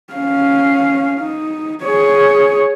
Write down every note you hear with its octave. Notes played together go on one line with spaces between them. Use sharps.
C#4 F5
D#4
G#4 C#5